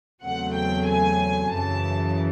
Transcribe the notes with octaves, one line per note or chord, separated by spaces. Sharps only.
E2 C#3 F#3 A3 C4 F#5
G5
G#5
F#2 C#3 E3 A5